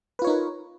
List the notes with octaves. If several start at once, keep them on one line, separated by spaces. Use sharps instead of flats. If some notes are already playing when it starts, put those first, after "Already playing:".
D#4 F4 A#4 B4 C#5